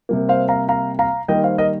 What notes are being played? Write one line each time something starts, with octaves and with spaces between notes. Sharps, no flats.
C3 G3 A#3
C5 F5
F5 A#5
F5 A#5
F5 A#5
D#3 G3 A#3 D#5 G5
C5 F5
A#4 D#5